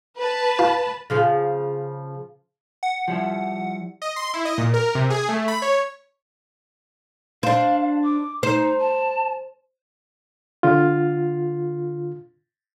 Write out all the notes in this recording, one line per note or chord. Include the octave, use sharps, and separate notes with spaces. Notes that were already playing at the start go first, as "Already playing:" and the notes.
B4 A5
F4
C#3 F3 G#4
F#5
F3 G3 E4
D#5
C6
E4
D#5
A#2
A#4
C3
G#4
A3
B5
C#5
D4 C5 F5
D6
D#4 C5
A5
D3 F4